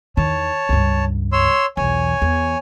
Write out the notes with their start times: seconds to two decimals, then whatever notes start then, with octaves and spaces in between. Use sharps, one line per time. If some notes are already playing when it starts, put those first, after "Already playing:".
0.17 E2 D#3 C#5 A5
0.69 C#2 G2
1.33 C#5 C6 E6
1.77 B1 E2 C#5 G#5
2.22 E2